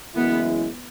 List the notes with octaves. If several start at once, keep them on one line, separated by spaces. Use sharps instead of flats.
F#1 F#2 E3 G#3 B3 E4